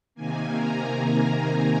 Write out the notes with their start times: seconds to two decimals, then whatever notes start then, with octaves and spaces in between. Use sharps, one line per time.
0.15 C3 D#3 A#3 G#5
0.54 A#5